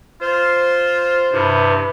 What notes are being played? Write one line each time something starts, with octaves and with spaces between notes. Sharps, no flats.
F4 C5
G2 C3 E4 B4